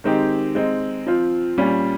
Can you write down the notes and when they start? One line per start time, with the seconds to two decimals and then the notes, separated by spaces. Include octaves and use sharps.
0.04 D#3 G#3 C4 D#4 G4
0.55 G#3 C4 D#4
1.07 F3 C4 F4
1.58 A#2 G3 C#4 F4